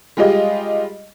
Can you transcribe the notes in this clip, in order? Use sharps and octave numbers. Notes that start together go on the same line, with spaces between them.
G3 G#3 F4 G4 D#5